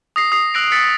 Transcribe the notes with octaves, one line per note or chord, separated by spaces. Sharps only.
D#6 A#6 C7
D#6 C7
E6 F#6 A#6 D7
E6 A6 B6 C#7